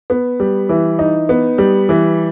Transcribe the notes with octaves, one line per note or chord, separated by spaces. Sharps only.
B3
G3
E3
D#4
B3
G3
E3